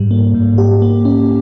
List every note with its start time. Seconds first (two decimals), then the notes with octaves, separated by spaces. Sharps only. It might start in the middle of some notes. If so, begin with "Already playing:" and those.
Already playing: G#2 G3
0.11 A#3
0.34 G#2
0.58 G4
0.82 A#3
1.05 C#4